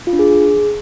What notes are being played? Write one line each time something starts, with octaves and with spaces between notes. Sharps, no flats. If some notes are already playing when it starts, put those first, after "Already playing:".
F4
D4
G#4